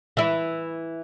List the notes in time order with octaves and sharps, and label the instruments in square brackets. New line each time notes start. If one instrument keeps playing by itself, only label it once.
[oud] E3 E4